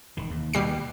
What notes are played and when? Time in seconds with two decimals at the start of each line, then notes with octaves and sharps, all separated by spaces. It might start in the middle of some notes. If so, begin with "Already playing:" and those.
0.17 E1 D#3
0.30 D#2
0.54 B2 G3 C7